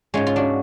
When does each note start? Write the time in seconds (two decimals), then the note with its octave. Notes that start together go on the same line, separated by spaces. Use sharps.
0.14 G#2 G#3 C#4 F4
0.27 F4
0.36 D4 F#4